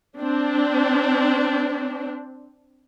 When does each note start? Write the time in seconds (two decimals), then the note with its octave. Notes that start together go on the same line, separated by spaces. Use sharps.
0.19 C4 D4